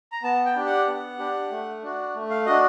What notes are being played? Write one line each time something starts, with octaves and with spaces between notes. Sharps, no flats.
A#5
B3 A5
G5
D4 G4
F#5
B3
D4 G4
A3
D4 F#4
A3
F5
D4 F#4 D#5